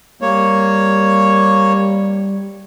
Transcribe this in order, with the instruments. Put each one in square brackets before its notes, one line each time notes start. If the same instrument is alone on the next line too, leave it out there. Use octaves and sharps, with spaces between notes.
[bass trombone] G3 [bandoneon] A#3 C#5